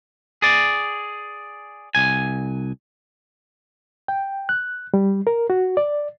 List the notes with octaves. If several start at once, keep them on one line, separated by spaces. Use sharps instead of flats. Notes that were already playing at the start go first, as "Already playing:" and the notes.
G#4 D5
C2 G#5
G5
F#6
G3
A#4
F#4
D5